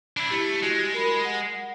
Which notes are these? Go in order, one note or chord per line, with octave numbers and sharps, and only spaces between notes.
D4 E4 B5
A3 E4 G4
G#3 F#4 G4
A#4 B5
F#5